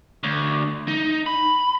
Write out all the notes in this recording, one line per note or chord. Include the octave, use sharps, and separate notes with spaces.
D2
D#4
B5